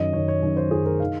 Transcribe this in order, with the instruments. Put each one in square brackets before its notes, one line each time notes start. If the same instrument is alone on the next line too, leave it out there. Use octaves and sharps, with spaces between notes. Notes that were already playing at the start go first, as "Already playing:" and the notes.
Already playing: [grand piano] F#2 D#3 D#5
F#2 D#3 C#5
C#5
F#2 D#3
C5
F#2 D#3 G#4
A#4
D#3 F5